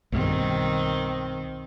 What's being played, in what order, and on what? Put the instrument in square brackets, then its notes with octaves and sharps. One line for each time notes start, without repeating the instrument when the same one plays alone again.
[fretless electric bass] B1 G2 [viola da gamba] D#3 C4